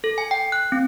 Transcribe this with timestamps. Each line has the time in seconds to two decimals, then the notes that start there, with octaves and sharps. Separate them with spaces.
0.04 A4
0.18 G#5
0.31 G5
0.52 F#6
0.72 C4